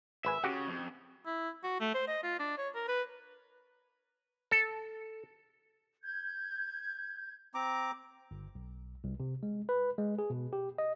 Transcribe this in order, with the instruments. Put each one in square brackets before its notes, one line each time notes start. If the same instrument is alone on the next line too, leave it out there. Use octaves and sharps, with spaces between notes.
[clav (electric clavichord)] G#1 B4 G#5 [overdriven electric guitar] E5
[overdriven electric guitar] C#3 [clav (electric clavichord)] F#4 G4 F#5
[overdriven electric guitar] F2
[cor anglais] E4
F#4
A3
C5
D#5
F4
D4
C#5
A#4
B4
[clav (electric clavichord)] A4
[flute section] G6 G#6
[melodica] C4 A#5 D6
[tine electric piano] G1
B1
C2
C3
G#3
B4
G#3
G#4
B2
G4
D#5